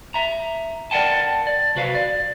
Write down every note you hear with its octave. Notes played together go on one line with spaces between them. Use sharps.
E5 A#5
A#4 D5 E5 F#5 G5 A5
D5
B1 C3 F#4 B4 F5
D5